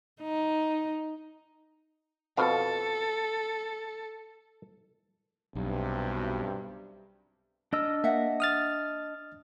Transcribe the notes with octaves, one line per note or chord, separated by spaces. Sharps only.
D#4
F2 B2 A4 F5
B1 G2 C3
D4 A#4 D#5 E6
A#3 E5 F#5
D#6 F6 A6